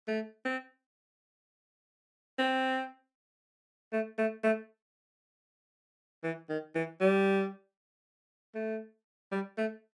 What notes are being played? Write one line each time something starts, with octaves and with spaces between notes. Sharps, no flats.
A3
C4
C4
A3
A3
A3
E3
D#3
E3
G3
A3
G3
A3